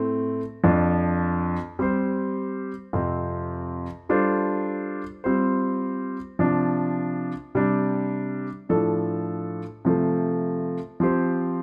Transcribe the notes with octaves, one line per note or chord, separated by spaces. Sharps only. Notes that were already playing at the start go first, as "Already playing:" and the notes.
Already playing: A2 A3 C4
F2 F3 D4
G3 C4 G4 C5
F2 C3 F3 C4
G3 D4 F4 A4 C5
G3 C4 F4 C5
C3 F3 D4
C3 G3 D4
A2 F3 D4 A4
C3 F3 A3
F3 C4 G4 C5